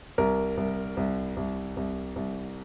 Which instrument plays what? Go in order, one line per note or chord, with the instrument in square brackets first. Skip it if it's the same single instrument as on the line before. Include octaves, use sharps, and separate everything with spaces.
[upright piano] C2 A#4
C2
C2
C2
C2
C2